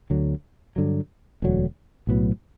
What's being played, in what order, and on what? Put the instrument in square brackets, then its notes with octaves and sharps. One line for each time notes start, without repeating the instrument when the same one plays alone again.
[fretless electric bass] D2 D3 F#3
G2 D3 F#3
E1 D2 D3 F#3
B1 A2 F#3 B3